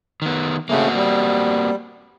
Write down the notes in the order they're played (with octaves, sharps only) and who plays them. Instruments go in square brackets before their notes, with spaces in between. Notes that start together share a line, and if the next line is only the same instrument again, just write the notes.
[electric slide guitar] D#3 B3
[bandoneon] C#3 A3 [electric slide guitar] A#3 C4 F#4
[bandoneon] G3